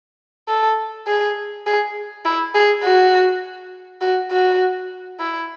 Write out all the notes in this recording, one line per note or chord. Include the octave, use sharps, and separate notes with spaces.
A4
G#4
G#4
E4
G#4
F#4
F#4
F#4
E4